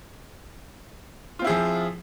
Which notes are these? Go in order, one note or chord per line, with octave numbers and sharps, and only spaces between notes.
F3 C4 E4 F4 G#4